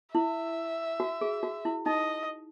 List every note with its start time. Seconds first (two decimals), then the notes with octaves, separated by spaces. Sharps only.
0.14 E4 E5
1.00 F#4
1.21 G#4
1.43 F#4
1.65 E4
1.86 D#4 D#5